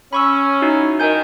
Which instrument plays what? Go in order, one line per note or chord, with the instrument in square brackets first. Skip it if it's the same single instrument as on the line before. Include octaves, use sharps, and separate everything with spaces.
[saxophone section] C#4 [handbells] B5 C#6 E6
[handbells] D#4 E4 F#4
[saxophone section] D#3 [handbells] A#4 G#5 G6